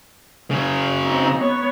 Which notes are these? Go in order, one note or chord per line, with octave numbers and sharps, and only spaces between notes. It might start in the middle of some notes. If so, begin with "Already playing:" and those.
C#3 F#3
C4 D#4
B3 C#5